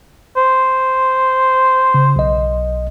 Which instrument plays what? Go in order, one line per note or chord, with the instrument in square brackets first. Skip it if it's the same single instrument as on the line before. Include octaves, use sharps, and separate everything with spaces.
[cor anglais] C5
[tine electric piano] C#3
B1 D#5